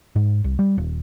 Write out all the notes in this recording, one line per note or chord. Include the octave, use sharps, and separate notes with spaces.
G#2
C2
G3
D#1